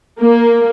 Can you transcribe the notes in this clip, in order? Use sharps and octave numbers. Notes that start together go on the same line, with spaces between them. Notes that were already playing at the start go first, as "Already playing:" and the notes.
A#3